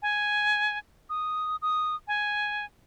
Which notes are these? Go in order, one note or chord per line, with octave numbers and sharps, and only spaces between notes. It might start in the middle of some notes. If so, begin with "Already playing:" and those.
G#5
D#6
D#6
G#5